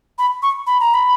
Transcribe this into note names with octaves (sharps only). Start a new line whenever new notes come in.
B5
C#6
B5
A#5
B5